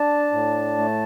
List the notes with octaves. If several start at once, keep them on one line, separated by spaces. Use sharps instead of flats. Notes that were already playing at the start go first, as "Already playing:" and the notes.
Already playing: D4 A5
A2
A3